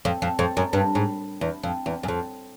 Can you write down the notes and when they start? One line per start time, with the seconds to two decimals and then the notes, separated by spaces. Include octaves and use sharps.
0.05 F2
0.22 F2
0.39 F2
0.57 F#2
0.73 G2
0.95 G#2
1.41 E2
1.63 F2
1.86 E2
2.03 F#2
2.08 F2